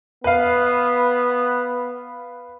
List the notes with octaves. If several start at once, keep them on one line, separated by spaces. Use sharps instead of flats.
B3 B4 F5